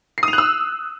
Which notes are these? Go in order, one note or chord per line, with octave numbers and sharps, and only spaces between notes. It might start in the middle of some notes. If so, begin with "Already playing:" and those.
C7
D#6
F7
F#6
E6